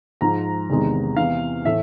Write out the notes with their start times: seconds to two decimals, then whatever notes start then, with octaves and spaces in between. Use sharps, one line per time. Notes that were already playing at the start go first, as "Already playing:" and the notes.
0.21 G#2 F3 G#3 A#5
0.69 E2 C3 D#3 G#3
1.16 E2 C3 E3 F5
1.65 A2 E3 A3 E5